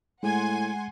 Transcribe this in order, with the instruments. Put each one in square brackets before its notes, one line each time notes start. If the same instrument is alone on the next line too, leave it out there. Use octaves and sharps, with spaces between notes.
[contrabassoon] A2 [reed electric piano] G#3 [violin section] F#5 G#5 C6